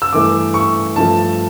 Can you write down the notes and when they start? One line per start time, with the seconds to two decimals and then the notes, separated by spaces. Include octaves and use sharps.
0.02 E6
0.12 G2 E3 A3 D6
0.54 C#6
0.96 G2 F3 A3 A5